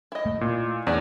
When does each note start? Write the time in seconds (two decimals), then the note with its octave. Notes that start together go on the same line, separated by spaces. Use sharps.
0.12 E4 D#5
0.26 A3
0.41 A#2
0.87 E2 D4 G#4 D5